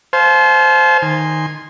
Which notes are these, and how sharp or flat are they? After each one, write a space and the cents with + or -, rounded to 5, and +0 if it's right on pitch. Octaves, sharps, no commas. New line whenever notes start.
C5 +0 F5 -5 A5 -40
D#3 +0 G#5 -15 C6 +0